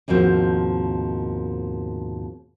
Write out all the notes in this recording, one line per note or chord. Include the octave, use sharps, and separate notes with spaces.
D#2 G#2 B2 F3 C4